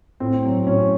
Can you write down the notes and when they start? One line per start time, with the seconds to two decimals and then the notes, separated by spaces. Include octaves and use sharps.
0.20 A2 C4
0.44 F#3
0.67 A2 C#4